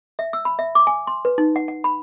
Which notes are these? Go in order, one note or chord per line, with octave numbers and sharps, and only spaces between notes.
E5
E6
B5
E5
D6
G#5
C6
B4
D#4
F#5
F#5
B5